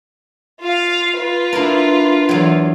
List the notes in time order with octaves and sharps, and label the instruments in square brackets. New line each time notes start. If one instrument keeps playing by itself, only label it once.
[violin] F4 F5
F4 B4
[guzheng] D4 E4 A#4
E2 F#3